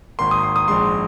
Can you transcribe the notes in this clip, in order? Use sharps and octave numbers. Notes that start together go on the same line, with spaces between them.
G#1 G#2 D#3 A#3 C6
D#6
C6
D#6
A#1 G#2 G#3 C6